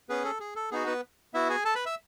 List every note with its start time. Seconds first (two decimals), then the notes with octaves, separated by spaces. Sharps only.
0.09 B3 C#4 G#4 B4
0.25 A4
0.40 G#4
0.56 A4
0.71 B3 D#4 F#4 G#4
0.87 B3 B4
1.34 B3 E4 F#4 E5
1.50 G#4 G#5
1.65 A4 A5
1.75 B4 B5
1.86 E5 E6